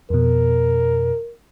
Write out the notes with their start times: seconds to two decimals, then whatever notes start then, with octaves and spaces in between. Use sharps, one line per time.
0.10 F2 B2 A#4